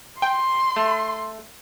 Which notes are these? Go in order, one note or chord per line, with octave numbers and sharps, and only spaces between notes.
G5 C6
A3